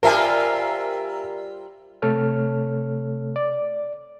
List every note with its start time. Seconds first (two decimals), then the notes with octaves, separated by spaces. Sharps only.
0.03 G3 F4 A#4 C5 E5 G#5
2.02 C3 A3 A4 C#5 F6
3.36 D5